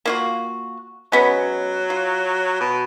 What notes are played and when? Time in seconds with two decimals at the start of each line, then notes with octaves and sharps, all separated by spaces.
0.05 A#3 F4 F#4
1.12 F#3 G#3 B3 C#4
1.90 F4
2.61 B2